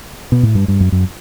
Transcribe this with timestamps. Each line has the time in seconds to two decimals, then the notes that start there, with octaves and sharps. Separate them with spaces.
0.32 B2
0.43 A2
0.55 G2
0.68 G2
0.80 F#2
0.92 F#2